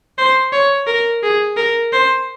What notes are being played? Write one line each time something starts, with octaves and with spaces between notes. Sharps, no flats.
C5
C#5
A#4
G#4
A#4
C5